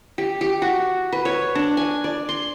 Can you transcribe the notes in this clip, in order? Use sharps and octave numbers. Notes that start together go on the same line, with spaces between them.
G4
G4
F#4
B4
C#5
D4
G#5
D5
C6